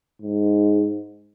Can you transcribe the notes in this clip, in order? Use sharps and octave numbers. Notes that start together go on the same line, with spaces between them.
G#2